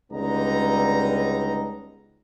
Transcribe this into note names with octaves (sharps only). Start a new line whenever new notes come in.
C#2 D3 G3 B3 D#4 A#5